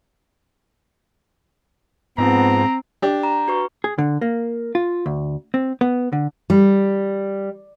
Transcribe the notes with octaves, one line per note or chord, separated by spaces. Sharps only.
G#2 F3 B3 C4 A#5
D4 G4
A#5
F#4 B4 C#6
G#4
D3
A#3
F4
D2
C4
B3
D3
G3